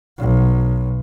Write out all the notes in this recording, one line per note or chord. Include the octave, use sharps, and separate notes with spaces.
B1